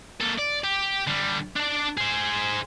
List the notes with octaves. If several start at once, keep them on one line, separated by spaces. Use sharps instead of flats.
A#3 A4
D5
G4
D3 G3
D4 D5
G#4 C5